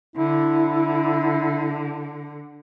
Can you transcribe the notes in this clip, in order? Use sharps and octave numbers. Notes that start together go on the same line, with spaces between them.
D3 E4